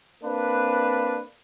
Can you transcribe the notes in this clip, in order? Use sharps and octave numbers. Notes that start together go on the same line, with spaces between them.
A#3 C4 D4 B4